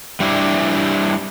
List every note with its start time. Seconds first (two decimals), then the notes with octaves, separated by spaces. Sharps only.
0.20 G3 D4 E4